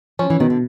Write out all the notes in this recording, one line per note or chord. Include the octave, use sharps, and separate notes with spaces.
F3 C#4
E3
B2 D#3
D3